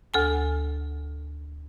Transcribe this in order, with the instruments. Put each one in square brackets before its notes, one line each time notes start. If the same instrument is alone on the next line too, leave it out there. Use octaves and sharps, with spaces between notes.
[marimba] D2 A4 G#5